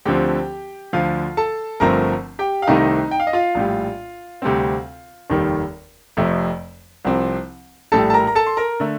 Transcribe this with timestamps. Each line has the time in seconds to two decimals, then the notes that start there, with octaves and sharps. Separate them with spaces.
0.05 D2 D3 F3 C4 G4 G5
0.93 D2 D3 F3 F4 F5
1.37 A4 A5
1.80 G1 G2 F3 A3 C4 A#4 A#5
2.39 G4 G5
2.62 F5
2.67 C2 C3 D#3 A3 C4 D#4 D#5
3.11 G5
3.20 F5
3.27 D#5
3.33 F4 F5
3.55 A#1 A2 G3
4.42 D2 C3 G3 C4
5.30 F1 D#2 D#3 G3
6.17 F1 F2 C3 F3 A3
7.05 C2 C3 F3 C4
7.92 A#1 A2 G3 A4 A5
8.10 A5
8.14 A#4 A#5
8.27 A#5
8.35 A4 A5
8.47 C6
8.57 A#4 A#5
8.80 D3 A3